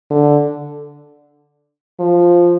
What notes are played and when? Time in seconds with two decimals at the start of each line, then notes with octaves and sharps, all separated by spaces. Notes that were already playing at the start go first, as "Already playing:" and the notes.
0.10 D3
1.99 F3